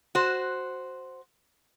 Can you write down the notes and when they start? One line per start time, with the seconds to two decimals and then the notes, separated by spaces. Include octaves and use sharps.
0.15 F#4 C5